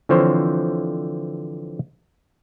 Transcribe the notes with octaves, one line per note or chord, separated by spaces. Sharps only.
D3 E3 F3 C4 C5 C#5